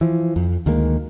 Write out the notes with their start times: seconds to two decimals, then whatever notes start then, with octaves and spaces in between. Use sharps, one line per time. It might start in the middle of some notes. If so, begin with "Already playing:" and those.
0.01 E3 F3
0.36 F2
0.66 D2 D#3 G#3 A#3